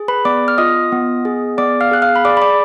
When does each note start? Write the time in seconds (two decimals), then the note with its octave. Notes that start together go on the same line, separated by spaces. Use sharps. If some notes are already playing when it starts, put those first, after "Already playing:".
Already playing: G#4
0.08 B4 B5
0.25 B3 D5 D6
0.48 F6
0.58 F4 D#5 D#6
0.92 B3
1.25 G#4
1.58 B3 D5 D6
1.81 F5 F6
1.91 G#4 F#6
2.02 F5 F6
2.16 B5
2.25 G#4 D5 D6
2.37 B5
2.42 D5 D6